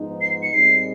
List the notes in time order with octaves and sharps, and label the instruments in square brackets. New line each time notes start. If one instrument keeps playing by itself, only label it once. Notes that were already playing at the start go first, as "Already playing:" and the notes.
Already playing: [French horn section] G#2 F3 G#3 B3 D#4
[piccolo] C7
C#7
[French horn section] A#2 G3 C4 D#4 G#4 [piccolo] C7